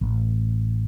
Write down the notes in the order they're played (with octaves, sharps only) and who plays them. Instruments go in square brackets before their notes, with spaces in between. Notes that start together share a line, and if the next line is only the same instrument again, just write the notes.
[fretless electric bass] A1